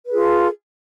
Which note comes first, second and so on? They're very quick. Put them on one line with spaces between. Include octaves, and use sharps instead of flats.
B4 G#4 F4 A4